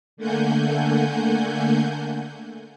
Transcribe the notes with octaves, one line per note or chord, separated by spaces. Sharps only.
D3 A3 A#3 F#5 G#5 G6